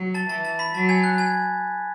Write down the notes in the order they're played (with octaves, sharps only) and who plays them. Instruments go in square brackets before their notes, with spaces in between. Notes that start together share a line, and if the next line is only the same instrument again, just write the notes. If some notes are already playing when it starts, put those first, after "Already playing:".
Already playing: [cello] F#3
[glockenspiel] A5 A6
[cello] E3 [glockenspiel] A5 A6
[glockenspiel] A5 A6
B5 B6
[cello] F#3 [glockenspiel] A5 A6
[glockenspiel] G#5 G#6
F#6
G#5 G#6